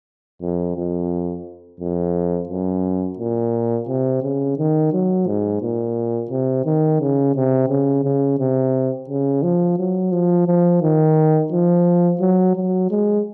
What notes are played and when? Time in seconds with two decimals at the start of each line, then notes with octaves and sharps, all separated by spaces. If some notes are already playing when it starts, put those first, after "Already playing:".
0.42 F2
0.76 F2
1.80 F2
2.49 F#2
3.19 A#2
3.88 C3
4.23 C#3
4.58 D#3
4.93 F#3
5.27 G#2
5.62 A#2
6.30 C3
6.65 D#3
7.00 C#3
7.36 C3
7.69 C#3
8.04 C#3
8.39 C3
9.09 C#3
9.43 F3
9.78 F#3
10.12 F3
10.47 F3
10.82 D#3
11.52 F3
12.21 F#3
12.55 F#3
12.91 G#3